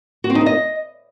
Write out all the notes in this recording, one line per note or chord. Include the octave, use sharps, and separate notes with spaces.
F#4
C4
D#4
C5
D#5